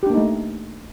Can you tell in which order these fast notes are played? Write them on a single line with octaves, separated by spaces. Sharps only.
G4 D4 A#3 D#4 A3